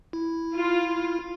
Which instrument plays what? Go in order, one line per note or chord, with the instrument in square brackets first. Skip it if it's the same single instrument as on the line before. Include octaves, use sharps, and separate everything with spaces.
[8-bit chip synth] E4
[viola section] F4